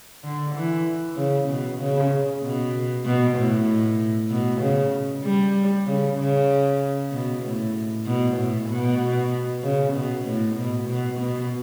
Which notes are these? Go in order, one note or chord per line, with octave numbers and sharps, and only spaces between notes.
D3
E3
C#3
B2
C#3
B2
B2
A2
B2
C#3
G3
C#3
C#3
B2
A2
B2
A2
B2
C#3
B2
A2
B2
B2
B2